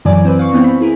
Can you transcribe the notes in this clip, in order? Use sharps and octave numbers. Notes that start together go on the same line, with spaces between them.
F#2 E3 F#3 D5 G#5 D6
C4 B4
F5 C#6
E3 B3 C4
B5
E4 G#4 A#4